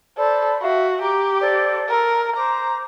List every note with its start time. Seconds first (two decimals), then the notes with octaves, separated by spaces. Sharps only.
0.18 A4 C5 D5 B5
0.62 F#4 E5 F5
1.01 G4 A#5 D6
1.41 A4 C5 D5
1.89 A4 A#4
2.36 C5 A#5 D6